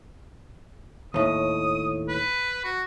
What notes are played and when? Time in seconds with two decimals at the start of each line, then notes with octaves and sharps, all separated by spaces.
1.14 D#2 A2 D#6
2.08 B4
2.65 F#4